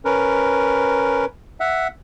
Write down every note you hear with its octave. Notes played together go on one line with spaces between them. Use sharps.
C#4 A#4 B4
E5 F#5